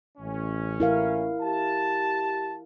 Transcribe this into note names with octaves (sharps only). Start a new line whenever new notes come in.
A1 C#4
E4 A#4 F5
G4 A5